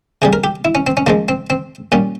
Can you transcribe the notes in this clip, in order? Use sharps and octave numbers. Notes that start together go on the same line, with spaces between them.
C3 G3 G#4
A#4
G4
E4
C#4
C4
C#4
C#3 F3 G#3 A#3
C4
C4
A#2 G3 C#4